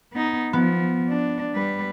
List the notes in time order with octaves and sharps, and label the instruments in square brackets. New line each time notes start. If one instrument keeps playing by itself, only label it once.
[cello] B3 D#4
[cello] F3 [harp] B3
[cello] D4
G3 B4